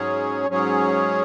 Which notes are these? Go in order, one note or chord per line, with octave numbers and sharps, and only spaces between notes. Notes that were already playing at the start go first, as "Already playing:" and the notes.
Already playing: G#2 F#3 C#4 G#4 C#5
G#2 F#3 C#4 G#4 C#5